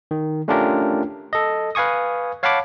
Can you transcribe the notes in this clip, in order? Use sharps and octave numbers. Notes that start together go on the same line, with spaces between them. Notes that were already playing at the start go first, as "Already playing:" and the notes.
D#3
A3 C#4 D4 F4 G4 A#4
A4 D#5
B4 F5 G#5 C#6 D#6
C#5 F5 F#5 A5 B5 D6